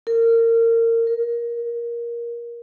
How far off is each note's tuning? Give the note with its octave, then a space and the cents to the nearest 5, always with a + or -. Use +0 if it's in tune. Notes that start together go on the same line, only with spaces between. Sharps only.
A#4 -25
A#4 +15